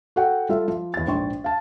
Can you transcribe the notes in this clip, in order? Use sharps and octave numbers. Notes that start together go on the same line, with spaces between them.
F#4 A4 F#5 G5
G3 F4 A4 E5
F3
E2 A6
A#1 G#2 G5 C6 C#6
F5 A5